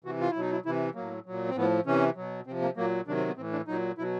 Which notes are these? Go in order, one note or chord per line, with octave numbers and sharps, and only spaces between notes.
C3 E3 F#4
F4
E4
B2 F#3 D#4
E4
C3 E3 E4
A2 F#3 A#3
A#2 F#3
C4
A2 F3 B3
C3 E3 C#4
B2 F#3
C3 F3 C4
A#3
A#2 F#3 A#3
C3 D#3 F#3 D4
C4
B3
A2 E3 C4
D4
A#2 F#3 D#4
B2 F#3 E4